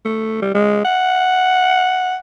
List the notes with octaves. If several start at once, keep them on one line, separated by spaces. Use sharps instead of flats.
A3
G3
G#3
F#5